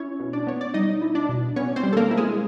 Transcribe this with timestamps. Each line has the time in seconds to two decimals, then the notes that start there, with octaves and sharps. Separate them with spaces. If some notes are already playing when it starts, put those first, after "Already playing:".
Already playing: C#4 E4 C#5
0.20 B2
0.33 D4 D5
0.47 B3 C#5
0.61 D5
0.74 G3 D#4 D#5
1.02 E4
1.15 D4 D5
1.29 B2
1.56 B3 C#4 C#5
1.76 C4 C5
1.83 G3
1.93 A4
1.97 A#3 A#4
2.11 E4
2.17 G#3 G#4